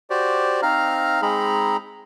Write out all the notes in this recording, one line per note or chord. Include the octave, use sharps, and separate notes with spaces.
F#4 G4 C5 D5
C4 D#4 F5 A#5 F6
G#3 C4 D#4 G#4 A#5 B5